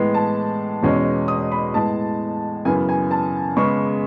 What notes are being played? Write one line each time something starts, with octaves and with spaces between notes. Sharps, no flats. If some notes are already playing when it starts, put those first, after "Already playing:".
Already playing: A2 E3 G#3 B3
A5
E2 B2 G#3 C#4
D#6
B5
A2 G#3 B3 A5
F#2 C#3 E3 B3 G#5
G#5
A5
C#3 G#3 B3 C#6